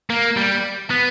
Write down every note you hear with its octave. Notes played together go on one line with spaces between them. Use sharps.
A#3
G3
B3